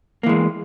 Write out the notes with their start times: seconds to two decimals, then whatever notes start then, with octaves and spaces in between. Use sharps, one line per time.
0.23 A#3
0.26 E3
0.29 G#3